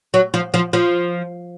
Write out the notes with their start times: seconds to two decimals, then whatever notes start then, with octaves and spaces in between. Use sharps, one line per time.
0.14 F#3
0.34 F3
0.54 F3
0.73 F3